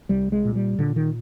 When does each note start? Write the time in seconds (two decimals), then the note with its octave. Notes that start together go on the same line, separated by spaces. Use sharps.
0.09 C2 G3
0.32 G#3
0.45 A#2
0.56 G3
0.79 A#2 D3
0.96 D#3